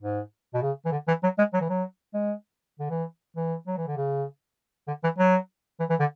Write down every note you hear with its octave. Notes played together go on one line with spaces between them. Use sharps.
G#2
B2
C#3
E3
D3
E3
F#3
G#3
F#3
E3
F#3
G#3
D3
E3
E3
F#3
E3
D3
C#3
D3
E3
F#3
E3
E3
D3